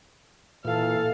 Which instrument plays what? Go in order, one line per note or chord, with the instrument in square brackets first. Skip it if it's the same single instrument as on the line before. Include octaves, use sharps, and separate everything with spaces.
[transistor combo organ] A#2 F4 [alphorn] E3 [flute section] A4 [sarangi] F5